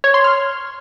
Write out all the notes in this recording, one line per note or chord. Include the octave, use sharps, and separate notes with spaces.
C#5
C6
F6